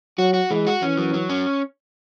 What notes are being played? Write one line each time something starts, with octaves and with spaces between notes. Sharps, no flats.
F#3 F#4
F#4
E3 G#3
F#4
E3 C#4
F#3
F#3
C#4